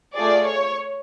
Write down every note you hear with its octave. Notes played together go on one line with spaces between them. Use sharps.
A3 F4 G#4 D5
C#5